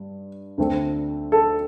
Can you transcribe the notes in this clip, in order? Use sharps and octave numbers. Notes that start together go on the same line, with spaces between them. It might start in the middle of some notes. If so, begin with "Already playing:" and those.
Already playing: G2
D2 D3 A3 C4
A4